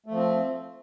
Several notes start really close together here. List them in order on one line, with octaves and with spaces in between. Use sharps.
A3 F3 C4